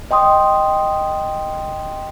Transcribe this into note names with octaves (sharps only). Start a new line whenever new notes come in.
D#5 G5 C6 D#6